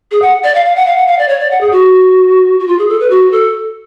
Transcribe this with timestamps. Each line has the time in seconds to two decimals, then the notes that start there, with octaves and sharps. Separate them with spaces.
0.11 G#4
0.22 F#5
0.44 D5
0.55 F5
0.66 F5
0.76 F#5
0.87 F5
0.97 F#5
1.07 F5
1.18 D5
1.29 C#5
1.40 D5
1.51 F#5
1.61 G#4
1.72 F#4
2.59 F#4
2.67 F4
2.79 G#4
2.89 A4
3.00 B4
3.10 F#4
3.31 A4